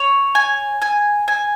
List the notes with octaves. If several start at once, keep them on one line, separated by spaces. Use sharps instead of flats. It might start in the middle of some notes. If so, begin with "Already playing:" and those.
Already playing: C#5
G#5
G#5
G#5